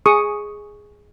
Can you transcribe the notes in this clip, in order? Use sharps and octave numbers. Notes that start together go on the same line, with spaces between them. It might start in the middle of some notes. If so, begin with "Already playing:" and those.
G#4 C#6 D#6